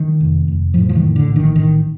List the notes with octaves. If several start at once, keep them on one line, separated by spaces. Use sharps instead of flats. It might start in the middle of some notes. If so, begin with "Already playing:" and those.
Already playing: D#3
F1
F1
A2 F3
F3
D#3
A2
D3
A#1
D#3
A1 D#3